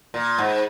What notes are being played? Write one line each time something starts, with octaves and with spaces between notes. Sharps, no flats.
A#2
G#2